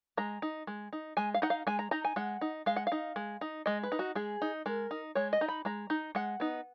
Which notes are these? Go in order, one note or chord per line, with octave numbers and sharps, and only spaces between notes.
G#3 A#5
D#4
G#3
D#4
G#3 G#5
F5
D#4 F#5
F5
G#3 G#5
A#5
D#4 A#5
G#5
G#3 F#5
D#4
G#3 F5
F#5
D#4 F5
G#3
D#4
G#3 D#5
B4
D#4
F#4
G#3 G#4
D#4
G#3 A#4
D#4
G#3 C#5
D#5
D#4
B5
G#3 A#5
D#4
G#3 F#5
B3 D#4